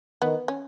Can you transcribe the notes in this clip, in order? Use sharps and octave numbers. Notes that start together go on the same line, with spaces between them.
D#3 B3
C#4